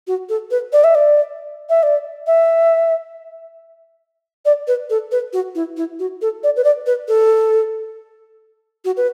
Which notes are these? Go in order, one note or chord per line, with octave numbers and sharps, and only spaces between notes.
F#4
A4
B4
D5
E5
D5
E5
D5
E5
D5
B4
A4
B4
F#4
E4
E4
F#4
A4
D5
B4
D5
B4
A4
F#4
B4